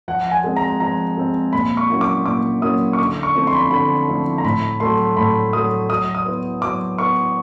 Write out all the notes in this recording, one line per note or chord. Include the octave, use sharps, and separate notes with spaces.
F3 F#5
G#5
G#3 C4
A#5
F3 A#5
G#3 C4
A#2 B5
C#6
F#3 A#3 C#4 E4
D6
A#2 D6
F#3 A#3 C#4 E4 D#6
C#6
D3 D6
C#6
F3 A3 C4 E4
C6
B5
C6
D3 B5
F3 A3 C4 E4
A#5
A2 B5
F#3 A3 C6
A2 B5
F#3 A3 D#6
F#3 D#6
D#6
B3 E4
F#3 D6
B3 E4 C#6